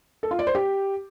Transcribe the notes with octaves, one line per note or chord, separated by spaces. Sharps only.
A4
F4
D5
C5
G4